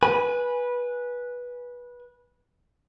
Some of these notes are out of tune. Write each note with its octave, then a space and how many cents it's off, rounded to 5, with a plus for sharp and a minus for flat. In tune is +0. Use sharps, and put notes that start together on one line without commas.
B4 -15 G#5 +0